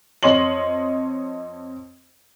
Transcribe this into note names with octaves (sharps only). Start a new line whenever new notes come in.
F2 C#5 D#5 C6 F#7